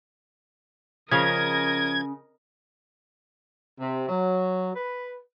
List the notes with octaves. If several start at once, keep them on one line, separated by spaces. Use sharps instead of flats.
C#3 F3 C#4 A#4 D#5 F5 G#6
C3
F#3
B4